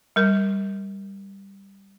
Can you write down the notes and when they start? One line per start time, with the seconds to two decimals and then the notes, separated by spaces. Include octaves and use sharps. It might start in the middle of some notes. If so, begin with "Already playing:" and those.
0.16 G3 A#4